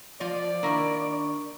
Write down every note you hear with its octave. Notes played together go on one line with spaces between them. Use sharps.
F3 F4 D5 D#5
D#3 A#3 D4 E4 A#5 C#6